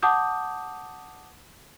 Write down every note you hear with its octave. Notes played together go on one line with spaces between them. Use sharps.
F#5 A5 D6 D#6 G6